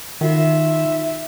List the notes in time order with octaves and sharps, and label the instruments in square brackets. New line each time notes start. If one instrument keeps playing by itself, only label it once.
[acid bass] D#3 [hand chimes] D#4 F4 F#4 [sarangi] E5